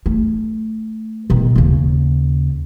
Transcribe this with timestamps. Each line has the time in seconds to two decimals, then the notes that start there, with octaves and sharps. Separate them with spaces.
0.06 A3
1.30 B2 D#3
1.55 D#2 C#3